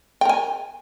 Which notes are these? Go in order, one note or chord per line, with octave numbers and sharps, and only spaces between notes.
A#4 G5 G#5